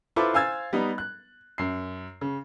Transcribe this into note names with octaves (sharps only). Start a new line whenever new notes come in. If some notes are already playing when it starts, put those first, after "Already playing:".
E4 F4 A4 B4 C5 D6
C5 F5 G#5 E6 G#6 A6
G3 B3 D#4
F#6
F#2 C7
C#3